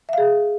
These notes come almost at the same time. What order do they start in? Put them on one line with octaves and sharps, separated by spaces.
E5 F5 G#4